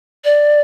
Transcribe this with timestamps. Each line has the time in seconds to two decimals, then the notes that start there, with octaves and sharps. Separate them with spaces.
0.24 D5